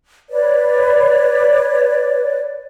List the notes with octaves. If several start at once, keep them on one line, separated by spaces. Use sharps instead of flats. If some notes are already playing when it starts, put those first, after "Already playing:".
B4 C#5 D5